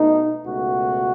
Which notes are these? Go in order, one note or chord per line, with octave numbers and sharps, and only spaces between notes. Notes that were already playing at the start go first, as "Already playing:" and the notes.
Already playing: B2 A3 D#4
C#2 B2 A3 F#4